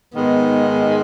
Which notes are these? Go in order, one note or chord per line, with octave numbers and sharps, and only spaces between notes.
G#2 D#3 G#3 B3